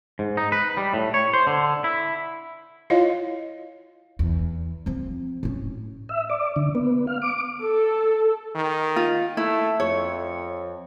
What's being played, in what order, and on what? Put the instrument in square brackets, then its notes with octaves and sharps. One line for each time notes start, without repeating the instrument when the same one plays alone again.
[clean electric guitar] G#2
D#4
B4
G3
A2
C#5
C5
D3
E4
[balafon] E4 F4 C#5 D#5 F5
[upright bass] E2
F3 C4
A2 C#4
[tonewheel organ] E5
D5
D3
B3
F5
D6
[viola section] A4
[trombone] D#3
[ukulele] F4
[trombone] A3 [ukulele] E4
[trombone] F2 [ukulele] C#5